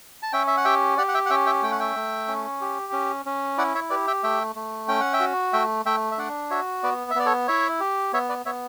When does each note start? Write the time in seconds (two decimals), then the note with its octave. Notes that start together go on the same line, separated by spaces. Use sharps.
0.23 A5
0.33 C#4 E5 G5
0.47 E5
0.57 F#5
0.65 G4 E5 G5
0.97 G4 D5 F#5
1.08 F#5
1.14 E5 G5
1.26 F#5
1.30 C#4 E5 G5
1.46 E5 G5
1.63 A3 G5
1.72 F#5
1.80 E5 G5
1.96 A3
2.28 C#4
2.61 G4
2.92 C#4
3.26 C#4
3.58 E4 D5 F#5
3.75 C#5 E5
3.90 G4 B4 D5
4.07 E5 G5
4.23 A3 E5 G5
4.56 A3
4.88 C#4 G5
5.01 F#5
5.13 E5 G5
5.20 F#4
5.53 A3 E5 G5
5.86 A3 E5 G5
6.11 E5
6.18 D4 D5 F#5
6.50 F#4 C#5 E5
6.83 B3 B4 D5
7.11 E5
7.15 B3 D5
7.26 A4 C#5
7.48 E4 C#5 E5
7.80 G4
8.13 B3 C#5 E5
8.29 B4 D5
8.46 B3 C#5 E5